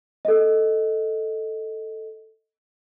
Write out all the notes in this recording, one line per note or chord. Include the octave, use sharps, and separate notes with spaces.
A4 D#5